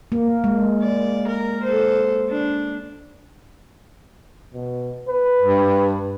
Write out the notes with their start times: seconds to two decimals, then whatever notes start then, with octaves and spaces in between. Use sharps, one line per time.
0.12 A#3
0.44 G#3
0.82 D5
1.28 A#4
1.63 A4 C5
2.30 D4
4.54 B2
5.08 B4
5.42 G2